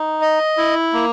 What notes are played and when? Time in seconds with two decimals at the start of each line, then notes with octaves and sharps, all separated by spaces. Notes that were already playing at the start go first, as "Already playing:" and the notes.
Already playing: D#4
0.21 D#5
0.57 E4
0.93 A#3